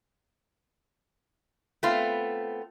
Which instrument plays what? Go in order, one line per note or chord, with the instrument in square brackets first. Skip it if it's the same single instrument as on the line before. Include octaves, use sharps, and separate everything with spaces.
[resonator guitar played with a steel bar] A3 B3 C4 F4